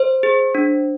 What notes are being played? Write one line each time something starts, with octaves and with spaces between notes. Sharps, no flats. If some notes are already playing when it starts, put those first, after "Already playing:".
Already playing: C5
G#4
D4